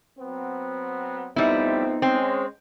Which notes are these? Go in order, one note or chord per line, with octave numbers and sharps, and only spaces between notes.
F#3 B3 C4
F3 G3 A3 B3 C4 D#4 E4
G#3 C4 C#4